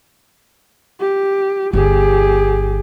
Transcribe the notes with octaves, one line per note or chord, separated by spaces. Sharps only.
G4
G1 G4 G#4